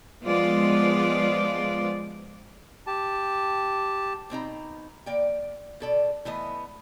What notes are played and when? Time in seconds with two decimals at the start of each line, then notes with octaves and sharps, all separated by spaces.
0.23 F3 G#3 B3 F4 D5
2.87 G4 A5
4.30 B2 C4 D#4 A#5
5.06 A#3 D5 G5
5.80 B2 A4 D5
6.25 E3 A3 B3 D#5